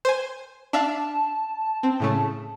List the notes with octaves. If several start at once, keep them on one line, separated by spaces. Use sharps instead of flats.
C5 G#5
D4 E5 F5 A5
C4
A2 C#3 A3